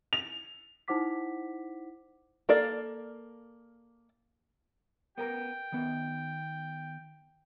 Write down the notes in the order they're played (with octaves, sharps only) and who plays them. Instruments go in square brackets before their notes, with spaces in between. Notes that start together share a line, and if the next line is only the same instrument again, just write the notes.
[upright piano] F7
[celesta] D#4 E4 C5 F#5 D6 B6
[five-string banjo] A#3 A4 A#4 D5 F5
[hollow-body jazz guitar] B3 A#4 A#5 [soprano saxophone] G5
[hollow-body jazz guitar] D#3 B3